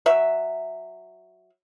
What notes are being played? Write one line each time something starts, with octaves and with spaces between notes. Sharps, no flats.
F#3 E5